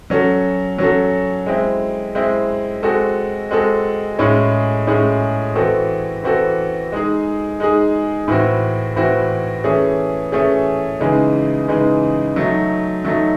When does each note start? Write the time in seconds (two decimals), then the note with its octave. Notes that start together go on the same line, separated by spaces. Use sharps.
0.10 F#3 C#4 F#4 A4
0.78 F#3 C#4 F#4 A4
1.46 G#3 C4 E4
2.15 G#3 C4 E4
2.83 G#3 C4 F#4 A4
3.51 G#3 C4 F#4 A4
4.19 A2 G#3 C#4 G#4
4.87 A2 G#3 C#4 G#4
5.55 E3 C4 F#4 A4
6.24 E3 C4 F#4 A4
6.92 G#3 D#4 G#4
7.60 G#3 D#4 G#4
8.28 A2 E3 C4 F#4
8.96 A2 E3 C4 F#4
9.64 E3 A3 C#4 G#4
10.32 E3 A3 C#4 G#4
11.00 C#3 E3 G#3 D#4
11.68 C#3 E3 G#3 D#4
12.36 F#3 A3 D#4
13.05 F#3 A3 D#4